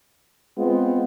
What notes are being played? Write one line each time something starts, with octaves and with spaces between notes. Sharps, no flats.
G#3 B3 C4 F4